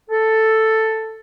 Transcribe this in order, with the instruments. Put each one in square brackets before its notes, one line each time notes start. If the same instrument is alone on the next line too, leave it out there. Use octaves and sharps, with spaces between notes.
[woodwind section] A4